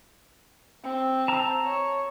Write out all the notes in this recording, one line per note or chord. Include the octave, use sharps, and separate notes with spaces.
C4
A5 A#5 E6
C#5